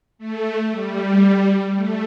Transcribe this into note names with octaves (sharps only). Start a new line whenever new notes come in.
A3
G3
A3